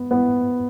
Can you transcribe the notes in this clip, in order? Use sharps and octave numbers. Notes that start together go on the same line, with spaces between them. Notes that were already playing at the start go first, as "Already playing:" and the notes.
Already playing: B3
B3